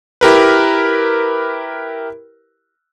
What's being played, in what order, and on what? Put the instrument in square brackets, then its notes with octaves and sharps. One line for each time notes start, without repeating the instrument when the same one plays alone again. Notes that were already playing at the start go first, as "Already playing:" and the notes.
[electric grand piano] E4 G4 A#4 B4